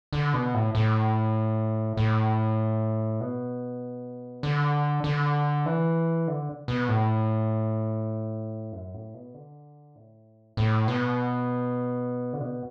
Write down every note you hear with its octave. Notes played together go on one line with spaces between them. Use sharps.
D3
B2
A2
A2
A2
B2
D3
D3
E3
D3
B2
A2
F#2
A2
B2
D3
A2
A2
B2
D3
B2